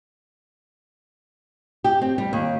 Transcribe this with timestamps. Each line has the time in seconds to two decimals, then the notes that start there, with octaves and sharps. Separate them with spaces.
1.84 G4
2.01 C4
2.18 G3
2.33 D#2